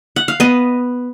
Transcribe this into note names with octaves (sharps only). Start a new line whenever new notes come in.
F#5
F5
B3 D#5